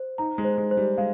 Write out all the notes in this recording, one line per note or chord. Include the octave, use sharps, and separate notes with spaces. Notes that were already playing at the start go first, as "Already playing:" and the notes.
Already playing: C5
D#4 A#5
G#3
C5
G#3
C5
G3
G#3 F5